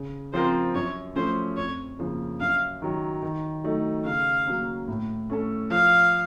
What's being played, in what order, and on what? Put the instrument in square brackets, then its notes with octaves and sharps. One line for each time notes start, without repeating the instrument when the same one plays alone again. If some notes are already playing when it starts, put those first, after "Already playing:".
Already playing: [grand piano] C#3
[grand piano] F3 C4 F4 A#4 [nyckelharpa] C5
[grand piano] F#2 [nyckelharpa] C#5
[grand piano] F3 A3 C#4 [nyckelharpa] C5
[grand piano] F2 [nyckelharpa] C#5
[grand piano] C#3 F3 A#3
[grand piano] F#2 [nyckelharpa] F5
[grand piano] D#3 F#3
D#3
F#3 A3 D#4
[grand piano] C#3 [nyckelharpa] F5
[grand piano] F#3 A#3 C#4
A2
A3 C#4 A4
[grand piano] F3 [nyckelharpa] F5